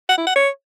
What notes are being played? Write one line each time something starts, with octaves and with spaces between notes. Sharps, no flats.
F#5
E4
F#5
C#5